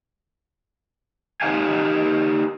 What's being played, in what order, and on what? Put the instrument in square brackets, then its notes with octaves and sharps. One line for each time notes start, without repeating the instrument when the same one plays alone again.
[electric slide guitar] D#4 G4 F5 G#5